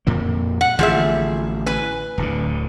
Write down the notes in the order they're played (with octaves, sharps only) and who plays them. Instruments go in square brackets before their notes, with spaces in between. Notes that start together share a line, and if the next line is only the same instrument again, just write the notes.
[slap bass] F2 A#2 A#3
[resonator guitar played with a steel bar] F#5
[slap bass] A1 D3 [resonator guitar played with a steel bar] F3 G#4 E5
[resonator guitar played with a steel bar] B4 G#5
[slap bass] D1 D2 D3